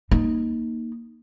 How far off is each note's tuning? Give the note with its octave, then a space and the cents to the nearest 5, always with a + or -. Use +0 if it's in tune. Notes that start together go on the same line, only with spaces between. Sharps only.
A#3 +0 D#4 +0